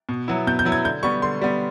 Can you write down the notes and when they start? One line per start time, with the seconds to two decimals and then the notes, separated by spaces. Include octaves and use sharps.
0.09 B2
0.28 F#3 B3 E4
0.47 B2 G6
0.59 G6
0.65 F#3 B3 E4
0.72 G#6
0.84 D3 G6
1.03 G3 B3 C#6
1.22 D3 C6
1.41 G3 B3